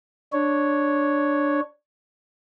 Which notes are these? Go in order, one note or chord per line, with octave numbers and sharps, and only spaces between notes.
D4 C#5